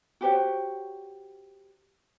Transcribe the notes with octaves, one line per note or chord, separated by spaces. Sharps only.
F#4 G4 C5 C#5